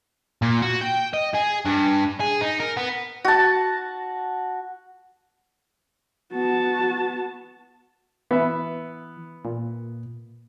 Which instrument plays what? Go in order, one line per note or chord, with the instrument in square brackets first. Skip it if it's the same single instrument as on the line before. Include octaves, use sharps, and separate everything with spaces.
[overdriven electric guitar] A#2
F#4
G5
D#5
G#4
G2
G#4
D#4
A#4
B3
[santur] F#4 A5
[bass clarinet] B3 [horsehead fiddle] F#4 A5
[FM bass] E3 [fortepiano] B3 E5
[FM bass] A#2